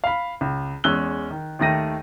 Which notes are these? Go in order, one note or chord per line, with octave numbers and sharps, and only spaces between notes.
F5 B5
C#2
E2 G#3 C#4 E6 F#6 G7
D#3
D#2 D#3 A3 A#6 D#7